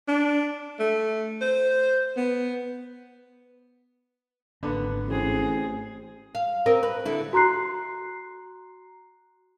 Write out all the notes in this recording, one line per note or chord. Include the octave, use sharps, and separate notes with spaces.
D4
A3
C5
B3
G#1 D3 A#3 B3 D4
A1 C4 G#4
F5
C4 A#4 D#5
B4
D3 E4
F#4 A#5 C6 F#6 C7